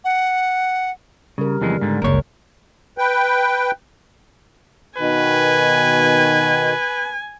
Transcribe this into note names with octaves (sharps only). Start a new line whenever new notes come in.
F#5
C#3 G3 A#4
F2 C#3 E3 G#3
G#2 D3
F#1 C#2 A#4 C#5
B4 G5
B2 D#3 B4 G#5